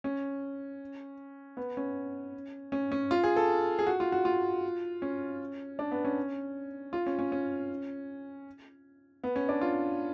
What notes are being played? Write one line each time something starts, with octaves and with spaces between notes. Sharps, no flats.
C#4
B3
C#4
C#4
C#4
F4
G#4
A4
G#4
F#4
F4
F#4
F4
C#4
D4
B3
C#4
F4
C#4
C#4
C#4
B3
C#4
D4
F4